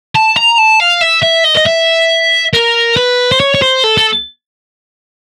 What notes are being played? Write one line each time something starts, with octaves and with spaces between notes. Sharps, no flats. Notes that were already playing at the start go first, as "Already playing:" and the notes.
A5
A#5
A5
F5
E5
E5
D#5
D#5
E5
A#4
B4
C5
C#5
C#5
C5
A4
A4